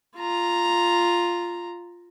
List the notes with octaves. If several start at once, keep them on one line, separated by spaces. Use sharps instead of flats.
F4 A#5